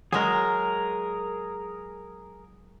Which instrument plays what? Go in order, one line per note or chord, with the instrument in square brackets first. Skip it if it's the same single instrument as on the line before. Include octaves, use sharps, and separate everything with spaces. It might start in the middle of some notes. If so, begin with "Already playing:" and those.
[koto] F#3 G#3 [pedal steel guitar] G#4 A#4